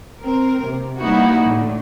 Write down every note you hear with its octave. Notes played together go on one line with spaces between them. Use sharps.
C4 A#4
C3
G3 A#3 B3 D#4 E4 F#4
A2 D3 A3